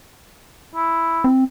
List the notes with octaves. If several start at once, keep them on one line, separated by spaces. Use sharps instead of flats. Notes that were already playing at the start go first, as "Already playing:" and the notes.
E4
C4